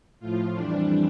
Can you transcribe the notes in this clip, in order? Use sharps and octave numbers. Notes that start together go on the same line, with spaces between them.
A2 F3 F4
F2 E3 G3 D4